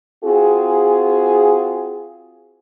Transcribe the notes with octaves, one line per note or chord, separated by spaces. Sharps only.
C4 F4 F#4 G#4